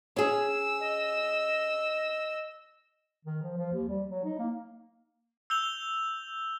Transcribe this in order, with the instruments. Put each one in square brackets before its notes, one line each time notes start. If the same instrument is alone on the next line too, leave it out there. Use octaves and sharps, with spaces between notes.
[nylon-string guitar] C#4 G#4 [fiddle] E6
[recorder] D#5
[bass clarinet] D#3
F3
F3
D#2
G3
F#3
D#4
A#3
[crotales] E6 G6 F7 G7